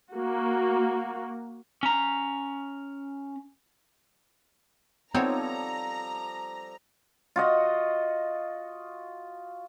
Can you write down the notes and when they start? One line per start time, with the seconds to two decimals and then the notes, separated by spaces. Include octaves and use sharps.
0.12 A#3 F#4
1.83 C#4 A#5
5.14 F3 G3 B3 C4 D#4 A4 C#5 A#5
7.36 F4 F#4 D#5